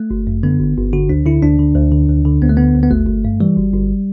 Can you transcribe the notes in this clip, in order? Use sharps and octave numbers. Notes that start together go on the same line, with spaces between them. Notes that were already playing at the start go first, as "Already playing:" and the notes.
Already playing: A3
G1
F#2
D3 B3
G1
G1
D3 F#4
D2 D4
D3 E4
D2 D4
D3
D2
D3
D2
D3
D2 B3
A3
D3 B3
D2
B3
G1 A3
G1
G2
E3 G3
G1
G1